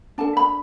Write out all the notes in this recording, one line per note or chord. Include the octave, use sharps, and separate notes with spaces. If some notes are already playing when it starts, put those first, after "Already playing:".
D4 A4 A5
B5